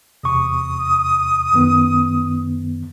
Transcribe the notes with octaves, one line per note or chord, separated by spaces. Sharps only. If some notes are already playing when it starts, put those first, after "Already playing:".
E2 C3 C#6 D#6
F#2 D#3 B3